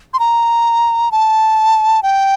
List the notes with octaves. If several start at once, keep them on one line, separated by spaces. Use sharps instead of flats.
C6
A#5
A5
G5